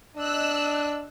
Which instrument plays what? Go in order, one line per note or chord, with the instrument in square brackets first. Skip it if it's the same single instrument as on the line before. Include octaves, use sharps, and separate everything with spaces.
[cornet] D4 [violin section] D#5 E6 F#6